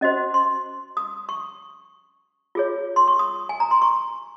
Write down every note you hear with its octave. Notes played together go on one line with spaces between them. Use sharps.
C#4 F#4 C5 D#5
C6
D#6
C#6
F4 G#4 C#5
C6
C#6
D#6
G#5
A#5
C6
C#6